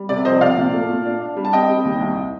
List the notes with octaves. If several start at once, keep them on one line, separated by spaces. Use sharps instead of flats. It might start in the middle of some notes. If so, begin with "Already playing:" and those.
Already playing: G3
C3 D5
F2 C5 D#5
C3 D5 F5
A#2
A3
A#2
D4
D4
G3
A5
C4 D#5 G5
G3
D#2
C2